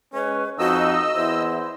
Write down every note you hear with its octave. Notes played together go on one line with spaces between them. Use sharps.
G#3 C#4 B4
F2 D#4 F#4 D#5 E6
E2 E4 C5